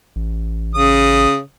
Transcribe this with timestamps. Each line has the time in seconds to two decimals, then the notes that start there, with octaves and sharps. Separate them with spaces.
0.16 A1
0.74 C#3 D#6